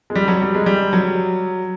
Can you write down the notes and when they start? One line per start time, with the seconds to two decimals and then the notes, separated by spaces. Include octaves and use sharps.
0.10 G#3
0.15 G3
0.28 F#3
0.42 G3
0.55 G#3
0.66 G3
0.93 F#3